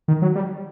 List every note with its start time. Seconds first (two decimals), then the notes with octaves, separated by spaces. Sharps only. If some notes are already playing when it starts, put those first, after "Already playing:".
0.08 D#3
0.22 F#3
0.36 G3